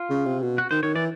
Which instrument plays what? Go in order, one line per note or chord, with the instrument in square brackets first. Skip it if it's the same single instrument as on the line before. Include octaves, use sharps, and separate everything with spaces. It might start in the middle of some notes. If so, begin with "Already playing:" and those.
Already playing: [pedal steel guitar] F4
[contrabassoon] C#3
C3
B2
[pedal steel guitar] F#4
[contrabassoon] D#3 [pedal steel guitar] C5
[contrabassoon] D#3 [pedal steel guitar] C#5
[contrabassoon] E3 [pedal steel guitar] D5